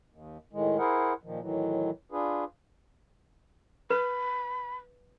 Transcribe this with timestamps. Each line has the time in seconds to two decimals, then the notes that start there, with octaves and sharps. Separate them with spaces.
0.10 D#2
0.53 A2 D#3 G#3
0.78 E4 G#4 A#4 C5 F#5
1.24 A#2 D#3 F3
1.41 A2 D#3 E3 F#3
2.12 D4 F4 G#4 B4
3.90 B4 B5